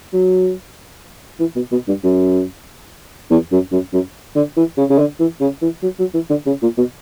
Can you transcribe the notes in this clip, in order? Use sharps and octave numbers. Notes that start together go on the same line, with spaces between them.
F#3
E3
B2
B2
G2
F#2
E2
F#2
F#2
F#2
D3
E3
C#3
C#3
D3
E3
C#3
E3
F#3
F#3
E3
D3
C#3
A#2
B2